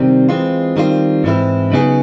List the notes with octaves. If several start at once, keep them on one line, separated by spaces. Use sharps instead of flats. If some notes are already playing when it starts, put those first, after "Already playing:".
Already playing: C3 D#3 G3 C4
E3 G#3 C4 F4
D#3 G3 C4 F4
G#2 E3 G#3 C4 E4
C#3 F#3 B3 D#4 G#4